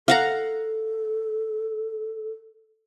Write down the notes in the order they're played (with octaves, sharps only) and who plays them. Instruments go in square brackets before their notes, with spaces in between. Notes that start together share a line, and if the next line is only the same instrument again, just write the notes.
[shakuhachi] A4 [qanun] F5 F#5 A#5